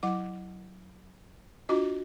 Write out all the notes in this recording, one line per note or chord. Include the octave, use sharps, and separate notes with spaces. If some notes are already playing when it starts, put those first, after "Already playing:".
F#3 E4 F#5 D6
D4 F4 F#4 D#5